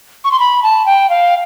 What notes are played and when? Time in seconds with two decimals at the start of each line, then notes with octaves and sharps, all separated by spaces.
0.24 C#6
0.32 C6
0.40 B5
0.63 A5
0.86 G5
1.10 F5